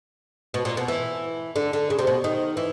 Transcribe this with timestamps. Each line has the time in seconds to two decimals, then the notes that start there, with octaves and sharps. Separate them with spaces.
0.54 B2
0.65 A#2
0.77 B2
0.88 E3
1.56 D3
1.73 D3
1.90 C#3
1.99 C3
2.07 B2
2.24 D#3
2.57 E3